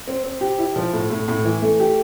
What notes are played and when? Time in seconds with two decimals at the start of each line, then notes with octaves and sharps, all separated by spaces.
0.07 C4
0.24 C4
0.41 G4
0.59 E4
0.76 F3
0.93 A2
1.10 A2
1.28 A2
1.44 E3
1.62 A3
1.80 G4